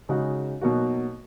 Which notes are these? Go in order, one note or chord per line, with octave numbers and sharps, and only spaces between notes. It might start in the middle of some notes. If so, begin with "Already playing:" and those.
C#3 G#3 D#4 F#4
B2 F#3 A#3 D#4 F#4